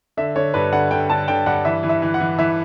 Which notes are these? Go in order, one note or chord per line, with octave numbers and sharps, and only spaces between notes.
D3 E5
D3 C#5
G2 B4
D3 F#5
D3 G5
D3 A5
D3 G5
G2 F#5
E3 E5
E3
E5
E3
F#5
E3
E3 E5